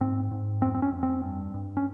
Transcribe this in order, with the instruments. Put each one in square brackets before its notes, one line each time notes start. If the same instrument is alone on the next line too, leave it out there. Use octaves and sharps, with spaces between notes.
[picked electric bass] G#2 C4
G#2
F2 C4
C4
C#4
F2
C4
G2
G2
C#4